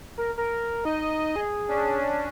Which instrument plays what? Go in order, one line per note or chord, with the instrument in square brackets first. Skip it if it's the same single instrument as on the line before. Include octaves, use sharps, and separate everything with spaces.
[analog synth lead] A#4
A#4
[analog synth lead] D#4 [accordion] D#5
[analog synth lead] G#4
[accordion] C#4 D4